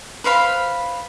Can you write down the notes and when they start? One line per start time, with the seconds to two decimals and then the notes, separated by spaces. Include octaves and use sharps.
0.24 B4 C5 F5 B5